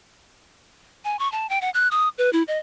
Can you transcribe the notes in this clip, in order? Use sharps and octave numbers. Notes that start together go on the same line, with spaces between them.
G#5
C#6
A5
G5
F#5
F#6
D#6
B4
E4
D#5